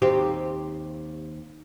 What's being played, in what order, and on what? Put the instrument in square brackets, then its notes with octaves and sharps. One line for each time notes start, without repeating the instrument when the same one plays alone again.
[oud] D#2 C4 G4